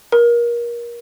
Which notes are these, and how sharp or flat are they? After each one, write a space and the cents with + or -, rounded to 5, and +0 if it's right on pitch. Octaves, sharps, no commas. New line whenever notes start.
A#4 +25